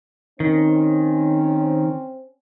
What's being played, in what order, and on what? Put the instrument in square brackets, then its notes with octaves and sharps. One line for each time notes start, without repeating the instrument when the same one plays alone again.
[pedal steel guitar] D#3 [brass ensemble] C4 C#4